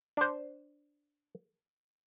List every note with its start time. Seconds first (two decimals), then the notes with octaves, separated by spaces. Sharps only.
0.17 D4 C5